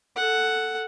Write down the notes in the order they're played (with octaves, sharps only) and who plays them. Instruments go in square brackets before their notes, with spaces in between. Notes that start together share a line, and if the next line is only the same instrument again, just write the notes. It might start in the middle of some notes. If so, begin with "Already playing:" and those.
[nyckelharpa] A4 F#5